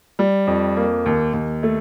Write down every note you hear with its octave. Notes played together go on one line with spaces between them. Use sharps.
G3
F2
A#3
D#2
D#2
A3